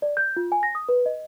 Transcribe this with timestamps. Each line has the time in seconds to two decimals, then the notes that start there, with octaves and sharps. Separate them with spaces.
0.02 D5
0.17 G6
0.37 F4
0.52 G#5
0.63 A#6
0.75 D#6
0.89 B4
1.06 D#5